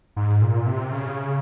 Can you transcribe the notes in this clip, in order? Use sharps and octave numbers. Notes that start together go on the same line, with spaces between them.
G#2
A#2
C3
C#3